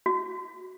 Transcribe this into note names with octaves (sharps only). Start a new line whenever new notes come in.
F#4